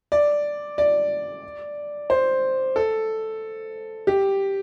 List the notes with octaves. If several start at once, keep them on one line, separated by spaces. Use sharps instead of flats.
D5
D5
C5
A4
G4